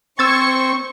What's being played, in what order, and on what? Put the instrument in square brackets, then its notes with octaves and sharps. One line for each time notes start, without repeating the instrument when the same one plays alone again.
[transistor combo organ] C4 [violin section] C5 C#6 [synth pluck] E6 G#6 A6